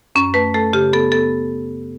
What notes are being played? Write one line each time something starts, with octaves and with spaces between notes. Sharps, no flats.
F#2 C#4
A3 B4
A3 A4
C#3 G4
B3 A4
B3 A4